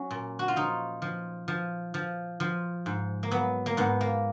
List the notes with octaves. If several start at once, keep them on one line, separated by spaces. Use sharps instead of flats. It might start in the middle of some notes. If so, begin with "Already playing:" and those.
Already playing: F#3 C#4
A#2
F#4
F4
F3 D#4
F3
F3
F3
F3
G#2
A#3
F#3 B3
A#3
G#2 B3
A#3